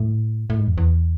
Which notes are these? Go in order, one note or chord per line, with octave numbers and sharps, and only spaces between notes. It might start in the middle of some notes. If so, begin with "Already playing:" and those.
Already playing: A2
A2
G#2
E2
E2